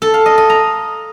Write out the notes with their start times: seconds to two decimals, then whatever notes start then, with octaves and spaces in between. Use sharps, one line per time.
0.02 A4
0.14 F5
0.26 D#5
0.38 D#5
0.50 A#5